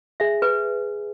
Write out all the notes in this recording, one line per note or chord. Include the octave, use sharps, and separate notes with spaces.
G#4 E5
B4